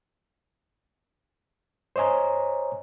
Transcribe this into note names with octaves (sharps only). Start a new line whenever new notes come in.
C5 C#5 D#5 G#5 A#5